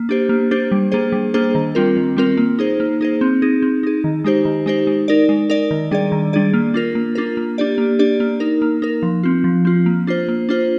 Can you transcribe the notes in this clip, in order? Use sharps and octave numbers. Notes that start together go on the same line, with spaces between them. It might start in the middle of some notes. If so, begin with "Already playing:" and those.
Already playing: A#3
D4 G4 C5
A#3
D4 G4 C5
G3
A#3 D4 G#4 C5
G3
A#3 D4 G#4 C5
D#3
G3 C4 F4 A#4
D#3
G3 C4 F4 A#4
A#3
D#4 G#4 C5
A#3
D#4 G#4 C5
C4
D#4 G#4
C4
D#4 G#4
D#3
G#3 D#4 G4 C5
D#3
G#3 D#4 G4 C5
G#3
D#4 A#4 D5
G#3
D#4 A#4 D5
D#3
G3 D4 G#4 D5
D#3
G3 D4 G#4 D5
A#3
D4 F4 A#4
A#3
D4 F4 A#4
A#3
D4 G4 D5
A#3
D4 G4 D5
A#3
D#4 A#4
A#3
D#4 A#4
F3
C4 F4
F3
C4 F4
A#3
D4 F4 C5
A#3
D4 F4 C5